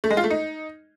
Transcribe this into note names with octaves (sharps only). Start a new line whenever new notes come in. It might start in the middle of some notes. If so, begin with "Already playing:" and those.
A3
G#3
F4
A3
D#4